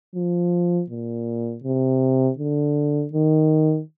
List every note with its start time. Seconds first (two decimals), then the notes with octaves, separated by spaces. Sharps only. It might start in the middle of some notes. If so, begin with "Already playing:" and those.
0.15 F3
0.90 A#2
1.64 C3
2.39 D3
3.14 D#3